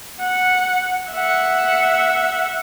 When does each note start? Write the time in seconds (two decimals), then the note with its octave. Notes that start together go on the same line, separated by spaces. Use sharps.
0.20 F#5
1.11 E5 F#5